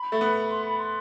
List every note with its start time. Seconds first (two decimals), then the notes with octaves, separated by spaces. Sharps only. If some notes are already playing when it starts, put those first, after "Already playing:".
Already playing: B5
0.12 A3
0.21 B3
0.50 C6
0.65 B5
0.78 C6